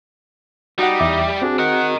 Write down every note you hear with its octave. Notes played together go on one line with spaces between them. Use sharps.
G3 D#4 F#4 G4 F#5
E2 E5 D6
C4 D4 F#4 G#4
A#4 D#5 F#5